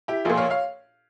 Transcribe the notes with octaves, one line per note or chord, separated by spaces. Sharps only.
E4 G4
A#1 A#2 F4 G#4
C#5 F5
C#5 F5